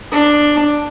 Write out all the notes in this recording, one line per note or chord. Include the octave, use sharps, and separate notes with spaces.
D4